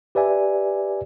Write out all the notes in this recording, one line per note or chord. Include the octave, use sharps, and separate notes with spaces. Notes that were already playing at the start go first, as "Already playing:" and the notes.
G4 B4 D5 E5 G#5